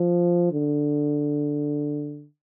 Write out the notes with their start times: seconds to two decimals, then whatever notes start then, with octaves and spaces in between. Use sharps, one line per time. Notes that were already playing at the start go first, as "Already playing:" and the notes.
Already playing: F3
0.52 D3